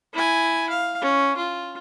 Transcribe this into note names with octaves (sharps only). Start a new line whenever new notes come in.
E4 G#5
F5
C#4
F4